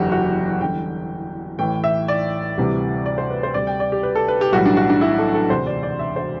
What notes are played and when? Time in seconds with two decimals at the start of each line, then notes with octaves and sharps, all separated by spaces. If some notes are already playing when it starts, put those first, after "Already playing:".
Already playing: F#1 E2 D3 F#3 F#4 G4
0.12 F#4
0.61 E2 D3 G3 G5
1.59 A1 A2 E3 G5
1.84 E5
2.08 D5
2.58 D2 C3 E3 G3
3.06 D5
3.18 C5
3.30 B4
3.43 C5
3.54 D2 C3 G3 D5
3.67 G5
3.80 D5
3.92 G4
4.03 B4
4.16 A4
4.28 B4
4.41 G4
4.52 B1 A2 E3 G3 F#4
4.66 D4
4.77 F#4
4.90 D4
5.01 E4
5.19 A4
5.34 A4
5.50 E1 D2 C3 C5
5.67 D5
5.83 D5
5.99 E5
6.16 C5